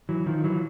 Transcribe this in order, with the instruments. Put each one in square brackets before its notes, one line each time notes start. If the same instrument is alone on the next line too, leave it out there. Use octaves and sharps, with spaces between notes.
[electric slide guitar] E3 F#3
D#3 F3
E3 F#3